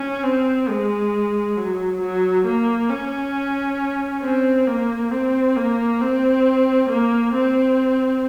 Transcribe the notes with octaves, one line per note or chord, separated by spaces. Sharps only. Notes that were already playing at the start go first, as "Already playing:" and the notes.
Already playing: C#4
C4
G#3
F#3
F#3
A#3
C#4
C4
A#3
C4
A#3
C4
A#3
C4